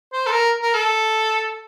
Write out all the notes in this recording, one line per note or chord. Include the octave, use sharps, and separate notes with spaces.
C5
A4
A#4
A#4
A4